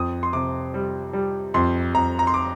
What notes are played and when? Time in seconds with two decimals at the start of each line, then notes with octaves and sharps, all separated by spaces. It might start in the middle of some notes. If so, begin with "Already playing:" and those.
Already playing: F2 D#6
0.23 C6
0.33 C3 D6
0.74 G3
1.13 G3
1.54 F2 C6
1.94 F2 A#5
2.19 A#5
2.27 C6
2.34 D6